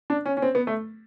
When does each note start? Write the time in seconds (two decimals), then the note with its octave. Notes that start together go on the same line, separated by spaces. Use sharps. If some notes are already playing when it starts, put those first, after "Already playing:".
0.10 D4
0.26 C#4
0.37 C#4
0.42 C4
0.55 B3
0.67 A3